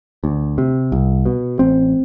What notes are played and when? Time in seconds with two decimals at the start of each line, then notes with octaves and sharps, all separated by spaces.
0.24 D2
0.58 C3
0.92 C2
1.26 B2
1.59 A1 C4